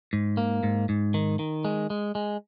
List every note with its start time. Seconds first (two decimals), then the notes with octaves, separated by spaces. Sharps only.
0.13 G#2
0.37 A#3
0.63 G#2
0.89 G#2
1.14 D#3
1.39 D#3
1.65 G#3
1.90 G#3
2.15 G#3